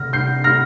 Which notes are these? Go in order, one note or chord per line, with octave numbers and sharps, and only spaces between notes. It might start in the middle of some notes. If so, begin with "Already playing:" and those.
Already playing: C3 F6 A#6
G6 C7
F6 A#6